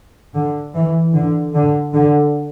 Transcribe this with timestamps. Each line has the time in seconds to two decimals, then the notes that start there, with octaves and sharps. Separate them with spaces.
0.34 D3
0.74 E3
1.13 D3
1.54 D3
1.93 D3